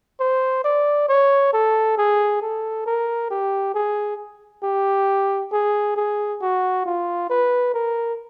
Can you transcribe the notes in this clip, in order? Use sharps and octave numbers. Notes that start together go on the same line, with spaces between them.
C5
D5
C#5
A4
G#4
A4
A#4
G4
G#4
G4
G#4
G#4
F#4
F4
B4
A#4